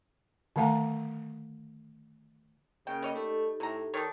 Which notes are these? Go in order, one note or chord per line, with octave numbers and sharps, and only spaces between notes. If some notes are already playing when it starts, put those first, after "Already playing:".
D3 D#3 A3 F5 F#5 A#5
C#3 A#3 C#4 A#4 G5
G3 C#5 D#5
A3 D#4 G4 A4
A2 C3 A#5
D#3 C#5 D5 A5